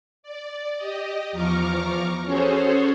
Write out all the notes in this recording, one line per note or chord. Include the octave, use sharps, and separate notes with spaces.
D5
G4 D#5
E2 F3 A#5 C#6 D6 F6
C#4 F#4 G#4 A4 C5 C#5